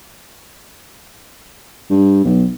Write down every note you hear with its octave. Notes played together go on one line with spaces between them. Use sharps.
G2
B1